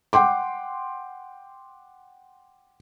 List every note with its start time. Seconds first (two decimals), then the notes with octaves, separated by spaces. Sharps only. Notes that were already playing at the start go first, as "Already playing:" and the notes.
0.13 F#5 G5 C6 D6